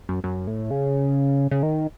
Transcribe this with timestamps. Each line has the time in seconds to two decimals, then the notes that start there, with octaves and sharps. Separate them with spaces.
0.09 F#2
0.24 F#2
0.47 A2
0.71 C#3
1.51 C#3
1.63 D#3